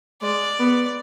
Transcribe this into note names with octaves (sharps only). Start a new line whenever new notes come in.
G#3 D5
B3